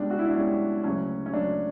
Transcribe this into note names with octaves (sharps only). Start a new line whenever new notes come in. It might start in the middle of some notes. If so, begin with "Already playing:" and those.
Already playing: C#2 B2 G3 D4
F#4
E4
D4
C#2 B2 G3 C#4
D2 C#3 F#3 C#4
C#4
D2 C#3 F#3 D4